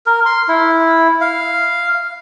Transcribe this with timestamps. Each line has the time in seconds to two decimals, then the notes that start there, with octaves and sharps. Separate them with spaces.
0.06 A#4
0.26 C6
0.48 E4
1.21 F5